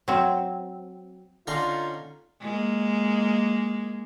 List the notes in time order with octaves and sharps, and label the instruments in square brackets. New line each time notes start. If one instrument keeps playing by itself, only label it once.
[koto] F#3 C4
[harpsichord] D3 A#5 C6 [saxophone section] C#4 D#4 [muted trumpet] F4
[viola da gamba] G#3 A#3